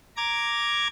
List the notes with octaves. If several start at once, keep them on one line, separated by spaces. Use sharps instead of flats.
A#5 D6 G#6